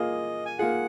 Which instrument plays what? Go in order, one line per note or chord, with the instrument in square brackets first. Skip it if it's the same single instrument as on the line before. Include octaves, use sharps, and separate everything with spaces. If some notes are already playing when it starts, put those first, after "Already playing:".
Already playing: [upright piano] A#3 F4 G#4 [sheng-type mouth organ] D#5
[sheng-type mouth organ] G#5
[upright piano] A#3 F4 G#4 [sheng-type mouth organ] F#5